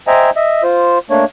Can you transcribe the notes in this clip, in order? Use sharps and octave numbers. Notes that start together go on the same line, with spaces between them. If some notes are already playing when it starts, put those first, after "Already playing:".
C5 D#5 E5 G5 G#5 A#5
D#5 E5
F4 C5
A3 A#3 D4 C#5